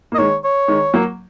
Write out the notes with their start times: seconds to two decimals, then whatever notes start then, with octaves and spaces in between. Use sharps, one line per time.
0.12 A#3
0.15 D#5
0.18 D#3 G#3 C#5
0.44 C#5
0.68 D#3 G#3
0.94 F#3 A#3